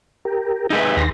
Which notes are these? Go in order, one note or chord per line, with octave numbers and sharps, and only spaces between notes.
G4 A#4
D#4 G#4 B4 E5
D#2 C6 A#6